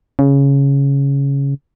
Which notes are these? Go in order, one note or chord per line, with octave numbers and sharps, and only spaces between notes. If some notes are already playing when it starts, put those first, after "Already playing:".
C#3